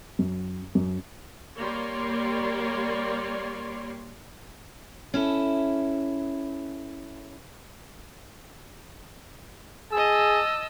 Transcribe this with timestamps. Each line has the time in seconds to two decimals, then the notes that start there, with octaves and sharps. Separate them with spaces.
0.19 F#2
0.75 F#2
1.58 G3 A#3 C#5 D5 C6
5.14 C#4 E4 A4
9.92 G#4 D#5 A5 E6